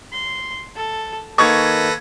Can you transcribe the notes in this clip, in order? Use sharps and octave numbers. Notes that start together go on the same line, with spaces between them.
C6
A4
D#3 A#3 A4 B4 D#5 C#6 G#6 A#6